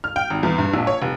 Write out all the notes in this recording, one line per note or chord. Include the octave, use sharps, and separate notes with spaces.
F6
G5
G#1
E2
G2
A#1
C#5
F1